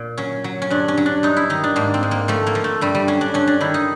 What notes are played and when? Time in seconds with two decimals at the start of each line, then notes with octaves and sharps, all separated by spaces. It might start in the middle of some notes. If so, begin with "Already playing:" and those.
Already playing: A#2
0.18 F#3 C#4
0.44 F#3
0.62 C#4
0.70 G2 D4
0.88 C#4
0.97 F#3
1.06 D4
1.23 G2 D#4
1.37 E4
1.50 D#3 D#4
1.64 D4
1.76 G#2 A#3
1.94 C4
2.03 G#2
2.11 A#3
2.28 F3 A3
2.47 A#3
2.55 F3
2.64 A3
2.81 G2 G3
2.95 G3
3.08 F#3 C#4
3.21 D4
3.34 G2 C#4
3.47 D4
3.61 D#3 E4
3.74 D#4